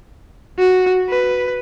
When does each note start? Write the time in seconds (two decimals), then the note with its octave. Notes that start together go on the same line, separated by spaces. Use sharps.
0.59 F#4
1.09 B4